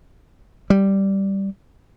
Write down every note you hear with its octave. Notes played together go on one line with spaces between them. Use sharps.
G3